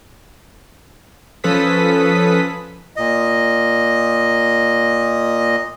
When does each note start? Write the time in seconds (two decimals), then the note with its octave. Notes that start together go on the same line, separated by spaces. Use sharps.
1.44 F3 C#4 A4 B4 D#6 B6
2.96 A#2 D#5